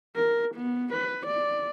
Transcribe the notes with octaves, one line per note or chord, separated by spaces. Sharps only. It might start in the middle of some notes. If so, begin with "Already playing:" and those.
A#4
B3
B4
D5